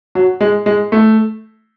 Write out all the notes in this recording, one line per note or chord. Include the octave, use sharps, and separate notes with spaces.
F#3
G#3
G#3
A3